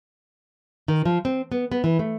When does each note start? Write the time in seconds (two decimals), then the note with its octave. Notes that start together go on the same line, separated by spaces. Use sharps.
0.88 D#3
1.05 F3
1.25 C4
1.52 B3
1.72 B3
1.84 E3
1.99 A3